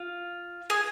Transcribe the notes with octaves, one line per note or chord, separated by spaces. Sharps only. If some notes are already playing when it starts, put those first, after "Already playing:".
Already playing: F4
G#4